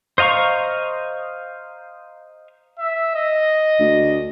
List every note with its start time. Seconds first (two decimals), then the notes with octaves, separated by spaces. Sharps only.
0.18 C5 D#5 F5 A#5 C#6
2.79 E5
3.15 D#5
3.80 D2